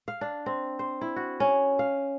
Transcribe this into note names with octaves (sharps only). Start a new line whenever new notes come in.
F5
D4
C4
C5
E4
F#4
C#4
F5